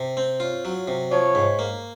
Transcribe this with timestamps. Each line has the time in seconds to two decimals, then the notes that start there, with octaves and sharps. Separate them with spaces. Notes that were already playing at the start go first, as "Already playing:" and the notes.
Already playing: C3
0.17 C4
0.40 F4 C#5
0.65 F#3
0.88 C3
1.11 F3 C#5
1.35 G#2
1.59 A#3